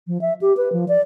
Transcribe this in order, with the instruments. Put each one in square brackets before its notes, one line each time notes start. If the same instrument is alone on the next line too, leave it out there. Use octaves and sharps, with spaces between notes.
[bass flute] F3
E5
G4
B4
F3
D5